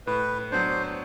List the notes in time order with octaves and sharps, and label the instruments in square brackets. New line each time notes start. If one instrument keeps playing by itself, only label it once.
[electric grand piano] A2 [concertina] B4
[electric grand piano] F#3 B3 D4 [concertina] C5